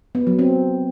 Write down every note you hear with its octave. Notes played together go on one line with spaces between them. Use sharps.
B3
F#3
C4